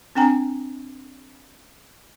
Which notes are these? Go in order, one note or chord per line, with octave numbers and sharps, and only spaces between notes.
C4 D4 G5 G#5 A#5